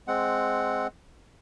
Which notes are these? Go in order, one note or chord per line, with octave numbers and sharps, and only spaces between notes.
G#3 C4 F#5